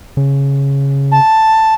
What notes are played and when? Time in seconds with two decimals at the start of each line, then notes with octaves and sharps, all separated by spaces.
0.17 C#3
1.12 A5